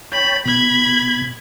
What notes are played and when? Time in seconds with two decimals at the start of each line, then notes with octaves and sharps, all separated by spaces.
0.12 C#5 G5 A5 B5
0.45 B2 B5 G#6